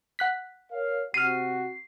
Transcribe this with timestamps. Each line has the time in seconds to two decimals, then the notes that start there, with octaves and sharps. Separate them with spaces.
0.19 F#5 F#6 B6
0.71 A#4 C#5 F5
1.14 C3 F#4 F6 C7 D#7